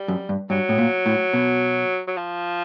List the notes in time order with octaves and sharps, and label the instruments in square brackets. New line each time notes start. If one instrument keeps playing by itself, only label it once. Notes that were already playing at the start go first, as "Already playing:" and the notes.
Already playing: [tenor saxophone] G3
[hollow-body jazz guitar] F#2
G2
[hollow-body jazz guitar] G2 [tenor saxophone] F#3
[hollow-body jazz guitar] A2
A#2
A2
B2
[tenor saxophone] F#3
F3